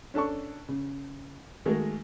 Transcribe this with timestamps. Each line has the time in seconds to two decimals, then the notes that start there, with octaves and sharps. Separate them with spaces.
0.14 C#4 D4 A4 A5 C#6
0.68 C#3
1.65 D#3 G#3 A3 F#4 G#4 A#4